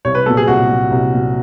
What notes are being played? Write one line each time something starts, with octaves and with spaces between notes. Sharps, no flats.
C2 C#5
B4
A#2 F#3 A4
G#4
C2 F#4
A#2 F#3
C2
A#2 F#3